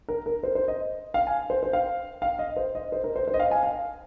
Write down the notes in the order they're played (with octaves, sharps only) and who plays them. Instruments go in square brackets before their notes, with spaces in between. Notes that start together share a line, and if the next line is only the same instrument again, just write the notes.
[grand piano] A#4
A#4
C5
C5
D#5
F5
G#5
C5
C5
F5
F5
D#5
C5
D#5
C5
A#4
C5
C5
D#5
F5
G#5
F5